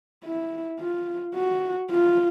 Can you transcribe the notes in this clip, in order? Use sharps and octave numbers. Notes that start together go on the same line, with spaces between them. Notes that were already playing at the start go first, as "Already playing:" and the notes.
E4
F4
F#4
F4